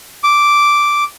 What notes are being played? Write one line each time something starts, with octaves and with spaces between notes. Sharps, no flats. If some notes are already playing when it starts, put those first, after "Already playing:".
D6